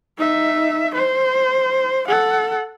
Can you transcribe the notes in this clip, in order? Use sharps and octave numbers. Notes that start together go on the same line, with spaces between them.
D#4 E5
C5
A4 F#5